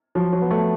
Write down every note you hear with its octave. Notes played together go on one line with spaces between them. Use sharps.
F3 F#3
F#3
B3
A3